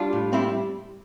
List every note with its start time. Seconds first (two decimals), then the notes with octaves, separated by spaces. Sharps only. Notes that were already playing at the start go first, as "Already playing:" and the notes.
Already playing: G3 D4 F4
0.13 A2
0.33 G3 C4 E4